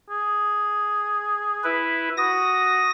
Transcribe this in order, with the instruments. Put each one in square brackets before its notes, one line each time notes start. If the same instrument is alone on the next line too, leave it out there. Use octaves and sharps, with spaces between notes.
[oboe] G#4
[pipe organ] E4 B4
[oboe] F#4 [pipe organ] D#6 A#6